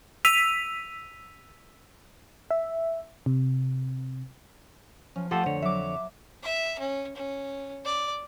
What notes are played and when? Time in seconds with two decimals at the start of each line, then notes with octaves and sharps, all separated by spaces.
0.25 E6 B6 D#7 F7
2.51 E5
3.26 C3
5.16 F3 C#4
5.31 F3 A3 F4 G4 A4 F#5
5.44 F2 D3 C5 C#5
5.62 F#3 E5 D6
6.43 E5
6.79 C#4
7.16 C#4
7.85 D5